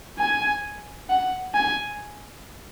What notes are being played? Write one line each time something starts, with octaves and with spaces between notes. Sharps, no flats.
G#5
F#5
G#5